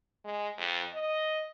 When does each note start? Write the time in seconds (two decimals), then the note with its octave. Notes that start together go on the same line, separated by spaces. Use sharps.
0.25 G#3
0.58 F2
0.94 D#5